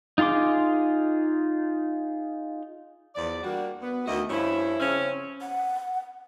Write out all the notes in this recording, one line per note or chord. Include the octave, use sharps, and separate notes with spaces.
D#4 F4 G#4 C6 D6
E2 F3 D5
G3 A#3 D4 F#4
B3
D2 D#3 A3 F#4 D#5
G2 F3 C#4 E4
C#3 F3 C4 C#4
F#5